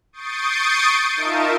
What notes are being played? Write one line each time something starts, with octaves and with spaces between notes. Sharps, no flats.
C#6 D#6 G6 A6 C7 D7
D#4 F4 A#4 E5 A5